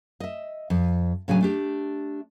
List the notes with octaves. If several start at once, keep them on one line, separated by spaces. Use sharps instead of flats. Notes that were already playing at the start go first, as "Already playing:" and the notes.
D#5 E5
F2
A2 C#3 F#3 D4 G#5
A3 D4 G4